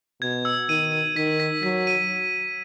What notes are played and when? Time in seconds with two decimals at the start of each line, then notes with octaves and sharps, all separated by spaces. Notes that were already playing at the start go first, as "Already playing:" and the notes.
0.22 B2 G#6
0.45 E6
0.69 D#3 D#7
0.92 D#7
1.16 D#3 B6
1.40 B6
1.63 F#3 B6
1.87 D#7